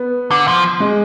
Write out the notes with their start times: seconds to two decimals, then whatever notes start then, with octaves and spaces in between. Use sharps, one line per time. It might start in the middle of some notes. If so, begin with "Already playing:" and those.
Already playing: B3
0.31 D3
0.48 F3
0.80 G#3